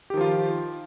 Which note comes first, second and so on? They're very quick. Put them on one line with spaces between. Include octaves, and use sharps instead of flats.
G4 D#3 F3 F4